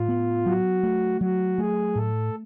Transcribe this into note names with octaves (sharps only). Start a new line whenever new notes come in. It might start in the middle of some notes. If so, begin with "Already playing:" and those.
Already playing: A2 F4
B3
F#3 F#4
A3
F#3 F#4
A3 G#4
A2 A4